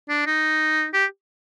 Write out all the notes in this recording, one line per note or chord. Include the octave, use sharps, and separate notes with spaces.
D4
D#4
G4